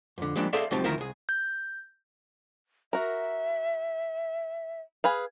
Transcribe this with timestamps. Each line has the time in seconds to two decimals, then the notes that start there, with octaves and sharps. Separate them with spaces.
0.18 F2 D3
0.36 F3 G3 G#3 A#3 D4
0.53 G#4 A4 C5 D5 E5 F5
0.71 C#2 F#3 C4 D#4 G4 A5
0.84 D2 D#3 F3 E4 A#4
0.98 C2 G#4
1.29 G6
2.93 F#4 A#4 E5
5.04 G#4 B4 F5